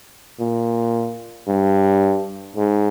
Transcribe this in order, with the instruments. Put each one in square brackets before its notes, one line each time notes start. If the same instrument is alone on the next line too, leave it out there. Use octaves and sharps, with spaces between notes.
[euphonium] A#2
G2
G#2